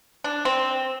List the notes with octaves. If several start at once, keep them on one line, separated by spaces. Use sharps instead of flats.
D4
C4